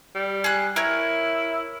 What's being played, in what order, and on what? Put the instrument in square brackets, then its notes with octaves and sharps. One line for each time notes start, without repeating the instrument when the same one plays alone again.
[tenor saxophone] G3
[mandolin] G#4 F#6
[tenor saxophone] E4 [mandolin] A#4 C#5